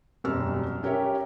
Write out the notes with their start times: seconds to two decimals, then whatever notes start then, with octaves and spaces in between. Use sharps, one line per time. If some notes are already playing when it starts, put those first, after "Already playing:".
0.24 E1 F#2 G3 E6 F6
0.83 C#4 G4 A#4 C#5 E5